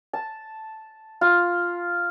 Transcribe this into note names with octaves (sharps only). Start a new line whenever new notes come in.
A5
F4